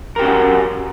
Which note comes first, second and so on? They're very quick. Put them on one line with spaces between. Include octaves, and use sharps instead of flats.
A#4 G4 C#4 F#4